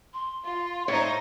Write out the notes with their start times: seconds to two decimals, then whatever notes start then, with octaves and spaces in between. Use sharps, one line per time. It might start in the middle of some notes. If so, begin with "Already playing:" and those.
0.13 C6
0.45 F4
0.88 A2 D#4 C5 C#5